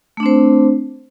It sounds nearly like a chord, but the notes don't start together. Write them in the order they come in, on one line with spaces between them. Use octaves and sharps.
A3 D4 C4 C5